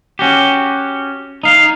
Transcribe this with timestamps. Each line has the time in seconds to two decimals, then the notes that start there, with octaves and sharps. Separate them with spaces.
0.19 C#4 F#4 G4
1.43 D#4 F5